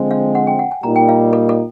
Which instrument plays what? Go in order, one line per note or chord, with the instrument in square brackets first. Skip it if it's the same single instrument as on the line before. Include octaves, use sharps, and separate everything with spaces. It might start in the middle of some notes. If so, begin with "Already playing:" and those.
Already playing: [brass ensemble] D3 F3 G#3 C4
[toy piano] F5
F#5
G5
F#5
G#5
[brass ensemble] A#2 G3 A#3 D#4 [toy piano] A#5
[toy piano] G5
F5
A4
A4